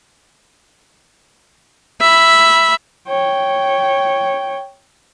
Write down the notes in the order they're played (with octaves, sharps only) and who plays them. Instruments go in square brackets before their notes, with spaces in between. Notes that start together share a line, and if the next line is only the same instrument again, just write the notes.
[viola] E5 B5
[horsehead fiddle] C#5 G5